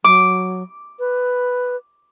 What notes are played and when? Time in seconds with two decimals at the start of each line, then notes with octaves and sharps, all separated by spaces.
0.04 F#3 D6
0.99 B4